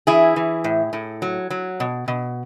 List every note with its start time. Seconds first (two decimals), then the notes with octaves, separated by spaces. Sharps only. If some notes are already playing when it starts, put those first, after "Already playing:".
0.07 E3 E4 G#4
0.36 E3
0.64 A2
0.93 A2
1.22 F#3
1.50 F#3
1.80 B2
2.08 B2